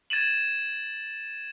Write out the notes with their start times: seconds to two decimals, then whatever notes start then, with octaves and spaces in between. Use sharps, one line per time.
0.10 G#6 A6 D#7 E7 F#7